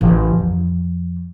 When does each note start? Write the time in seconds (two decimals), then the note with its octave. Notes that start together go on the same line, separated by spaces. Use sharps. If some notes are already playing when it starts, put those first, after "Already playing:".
0.01 A1 D3
0.38 F2